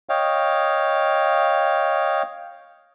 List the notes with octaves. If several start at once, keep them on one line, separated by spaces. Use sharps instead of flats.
C#5 D#5 F5 G5